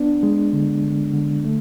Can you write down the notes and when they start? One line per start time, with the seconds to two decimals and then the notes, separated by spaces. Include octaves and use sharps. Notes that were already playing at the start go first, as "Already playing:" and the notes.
Already playing: B3 D4
0.23 G#3
0.53 D3
0.84 D3
1.13 D3
1.45 A3